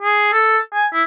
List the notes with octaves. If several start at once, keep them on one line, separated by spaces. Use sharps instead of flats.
G#4
A4
G#5
E4